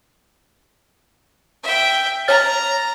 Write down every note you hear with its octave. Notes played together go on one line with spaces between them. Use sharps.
E5 G5
C#5 A#5 F6 A6